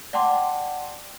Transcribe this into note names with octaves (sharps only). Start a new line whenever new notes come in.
D5 F#5 G5 A5 C6 D6